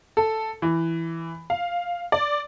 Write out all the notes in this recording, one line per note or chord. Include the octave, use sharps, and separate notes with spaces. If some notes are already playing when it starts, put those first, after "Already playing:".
A4
E3
F5
D5